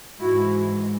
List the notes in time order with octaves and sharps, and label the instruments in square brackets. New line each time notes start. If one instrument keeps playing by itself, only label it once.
[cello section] G#2 E3 G#3 E4 F#4